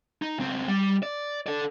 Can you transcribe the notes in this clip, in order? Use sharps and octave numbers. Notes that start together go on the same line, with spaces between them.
D#4
C#2 C4
G3
D5
A4 D5